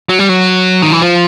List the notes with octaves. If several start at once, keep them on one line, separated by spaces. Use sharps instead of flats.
F#3
G3
F#3
D#3
E3
F3